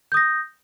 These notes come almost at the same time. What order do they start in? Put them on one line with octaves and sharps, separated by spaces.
G6 D#6 A#6